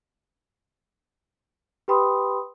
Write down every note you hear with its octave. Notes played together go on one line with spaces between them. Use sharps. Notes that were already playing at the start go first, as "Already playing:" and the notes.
G4 B4 G5 B5 C6 D#6